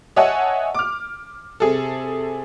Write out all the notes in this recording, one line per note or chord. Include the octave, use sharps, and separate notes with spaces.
C#5 D#5 E5 F#5 G#5 A5
D6 F6
C3 G#4 A4